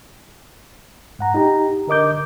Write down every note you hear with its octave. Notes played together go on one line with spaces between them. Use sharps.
G#2 F#5 A#5
D#4 G4 A#5
D3 A#4 D#5 D6 G6